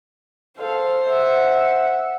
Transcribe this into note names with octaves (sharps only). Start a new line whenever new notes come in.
A4 C5 F5
E5 F#5